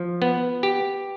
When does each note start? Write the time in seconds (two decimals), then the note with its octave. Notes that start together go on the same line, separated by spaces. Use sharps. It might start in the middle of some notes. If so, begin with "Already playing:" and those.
Already playing: F3
0.22 B3
0.63 G4